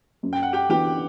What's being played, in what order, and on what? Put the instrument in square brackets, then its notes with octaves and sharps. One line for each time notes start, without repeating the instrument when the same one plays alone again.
[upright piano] F#2
[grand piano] G5
F#5
G4 G5
[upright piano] E3 B3 D4 F#4 [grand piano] G4 G5